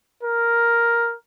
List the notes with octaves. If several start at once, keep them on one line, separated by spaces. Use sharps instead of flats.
A#4